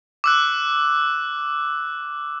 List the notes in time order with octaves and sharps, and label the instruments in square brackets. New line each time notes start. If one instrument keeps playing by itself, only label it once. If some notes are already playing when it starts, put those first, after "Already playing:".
[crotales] D6 E6 F#6